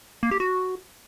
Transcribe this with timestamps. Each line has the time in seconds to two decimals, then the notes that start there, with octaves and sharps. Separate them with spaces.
0.23 A#3
0.31 G4
0.40 F#4